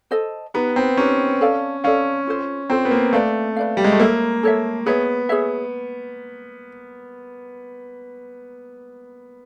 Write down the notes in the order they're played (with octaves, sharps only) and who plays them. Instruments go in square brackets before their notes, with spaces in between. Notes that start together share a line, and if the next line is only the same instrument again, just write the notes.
[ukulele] A4 C5 D#5
[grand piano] B3 [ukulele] D#4 G4 B4
[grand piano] C4
[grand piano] C#4 [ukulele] D#4 G4 B4
[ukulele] A4 D5 F5
[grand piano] C#4 [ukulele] A4 D5 F5
[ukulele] F4 A4 C5
[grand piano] C4 [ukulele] F4 A4 C5
[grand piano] B3
A#3
[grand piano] A3 [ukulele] B4 D5 F5
[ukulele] B4 D5 F5
[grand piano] G3
G#3
A3
[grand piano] A#3 [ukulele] A4 C#5 E5
[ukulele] A4 C#5 E5
[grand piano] B3 [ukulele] G#4 C#5 E5
[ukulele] G#4 C#5 E5